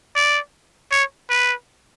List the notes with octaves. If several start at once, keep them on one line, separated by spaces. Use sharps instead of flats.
D5
C#5
B4